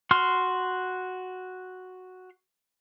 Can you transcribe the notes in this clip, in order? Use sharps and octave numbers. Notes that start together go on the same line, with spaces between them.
F#4 C6 F6